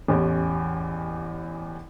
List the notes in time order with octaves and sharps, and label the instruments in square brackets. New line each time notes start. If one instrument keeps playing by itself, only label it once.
[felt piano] A1 E2 C#4 G4